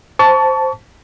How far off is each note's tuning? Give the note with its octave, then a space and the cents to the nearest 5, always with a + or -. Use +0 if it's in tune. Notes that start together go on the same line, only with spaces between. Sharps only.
C5 +0 A5 +0 C#6 +35